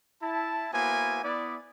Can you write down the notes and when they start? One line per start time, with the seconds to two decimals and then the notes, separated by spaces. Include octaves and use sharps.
0.22 E4 A5
0.72 A#3 B3 E4 F#4 C5 G#5
1.23 B3 E4 D5